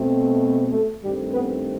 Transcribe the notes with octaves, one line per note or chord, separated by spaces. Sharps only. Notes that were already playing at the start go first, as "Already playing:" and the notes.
Already playing: B2 A3 C4
A3 A4
G2 D#3 G3 A3 C4 G4
B3 B4